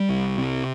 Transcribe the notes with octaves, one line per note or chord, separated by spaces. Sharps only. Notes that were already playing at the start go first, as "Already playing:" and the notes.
Already playing: G3
C2
C3